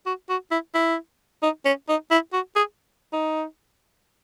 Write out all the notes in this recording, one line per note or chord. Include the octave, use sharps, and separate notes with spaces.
F#4
F#4
E4
E4
D#4
C#4
D#4
E4
F#4
G#4
D#4